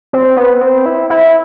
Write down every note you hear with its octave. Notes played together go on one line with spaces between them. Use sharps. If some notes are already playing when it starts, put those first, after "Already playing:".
C4
B3
C4
E4
E4